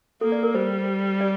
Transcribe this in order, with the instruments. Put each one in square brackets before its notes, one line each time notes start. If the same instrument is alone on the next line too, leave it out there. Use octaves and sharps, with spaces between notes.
[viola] A#3 [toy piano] A4
[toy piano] D5
A#4
[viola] G3 [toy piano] C5
[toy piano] D5